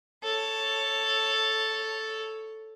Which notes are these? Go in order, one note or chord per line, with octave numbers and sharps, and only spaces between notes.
A4 C#5